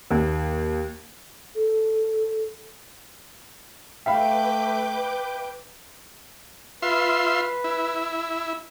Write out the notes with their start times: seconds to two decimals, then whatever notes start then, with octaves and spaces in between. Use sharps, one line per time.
0.11 D#2
1.55 A4
4.06 A3 B4 E5 F5 G5 B5 D6 G6
6.82 F4 B4 E5 C6
7.64 E4